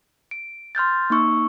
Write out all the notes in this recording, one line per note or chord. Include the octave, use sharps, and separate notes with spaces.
D7
C6 F6 G6 A6
A#3 D#4 C#6 E6